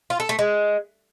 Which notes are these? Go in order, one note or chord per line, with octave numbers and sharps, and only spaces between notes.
F4
A4
A3
G#3